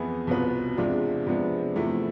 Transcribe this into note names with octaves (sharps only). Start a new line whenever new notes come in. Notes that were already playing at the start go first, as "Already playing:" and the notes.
Already playing: F2 E3 B3 E4 G#4
C2 B2 B3 F4 B4
E2 C3 G#3 D4 F4
C3 F3 G#3 B3 D4
E2 C3 F3 A3 E4